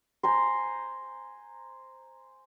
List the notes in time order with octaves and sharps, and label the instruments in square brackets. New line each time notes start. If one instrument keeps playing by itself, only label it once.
[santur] C5 G#5 A#5 C6